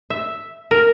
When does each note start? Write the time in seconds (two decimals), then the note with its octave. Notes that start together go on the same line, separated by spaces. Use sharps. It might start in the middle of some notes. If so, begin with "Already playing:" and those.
0.10 E5
0.71 A#4